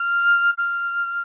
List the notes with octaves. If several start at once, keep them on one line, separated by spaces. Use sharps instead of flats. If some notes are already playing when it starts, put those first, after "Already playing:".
Already playing: F6
F6